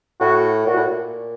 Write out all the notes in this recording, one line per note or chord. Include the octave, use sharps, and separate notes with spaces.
A2 F#4
A#2 F#4
A2
A#2